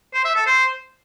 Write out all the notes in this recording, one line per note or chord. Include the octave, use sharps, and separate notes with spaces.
C5
E5
A4
C5